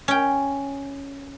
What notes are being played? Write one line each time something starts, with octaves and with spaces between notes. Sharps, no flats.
C#4 G5